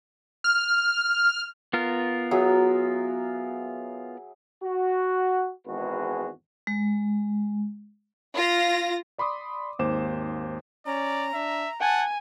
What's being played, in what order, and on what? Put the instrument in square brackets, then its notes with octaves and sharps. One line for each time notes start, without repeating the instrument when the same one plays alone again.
[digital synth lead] F6
[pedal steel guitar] B3 F4 A#4
[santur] F#3 G#4 E5
[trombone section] F#4
G#1 E2 G#3 F#4 B4
[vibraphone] G#3
[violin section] F4 A#6
[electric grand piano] D5 B5 C6 D6 D#6
G#1 D#2 C5 D6 E7
[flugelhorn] C#4 [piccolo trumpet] D5 [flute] A#5
[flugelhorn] D4 [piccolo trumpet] E5
[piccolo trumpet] F#5 [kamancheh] G#5 [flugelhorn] A5